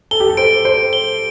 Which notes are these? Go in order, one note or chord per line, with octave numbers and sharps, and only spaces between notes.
A4 G7
G4
A4
C5 D7
C5 D7
G7